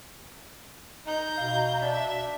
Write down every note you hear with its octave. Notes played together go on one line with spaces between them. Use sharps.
D#4 A#5 G6
B2 F5
D4 E5